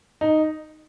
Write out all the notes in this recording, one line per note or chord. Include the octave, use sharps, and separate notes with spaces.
D#4